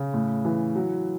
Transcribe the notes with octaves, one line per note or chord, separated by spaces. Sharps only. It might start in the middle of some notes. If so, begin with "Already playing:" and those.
Already playing: C#3
A2
E3
F#3